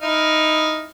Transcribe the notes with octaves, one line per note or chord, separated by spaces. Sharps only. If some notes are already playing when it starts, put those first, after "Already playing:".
D#4 E4 F6